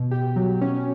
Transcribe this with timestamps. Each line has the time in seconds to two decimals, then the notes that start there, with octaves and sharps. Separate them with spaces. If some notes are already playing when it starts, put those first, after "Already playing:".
Already playing: B2
0.11 G4
0.36 F#3
0.61 C#4